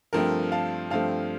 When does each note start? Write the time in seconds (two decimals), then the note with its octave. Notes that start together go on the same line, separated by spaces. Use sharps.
0.13 G2 F3 A3 C4 A#4
0.52 F5 A5
0.90 G2 F3 A3 C4 F5 A5